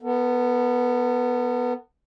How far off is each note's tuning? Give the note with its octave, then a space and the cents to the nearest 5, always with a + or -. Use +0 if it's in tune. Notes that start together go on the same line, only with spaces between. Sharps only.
B3 +0 A4 +45